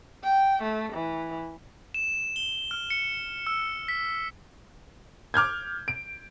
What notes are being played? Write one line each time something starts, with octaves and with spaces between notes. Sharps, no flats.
G5
A3
E3
E7
G7
F6
C#7
E6
B6
D6 F6 G6 G#6
D7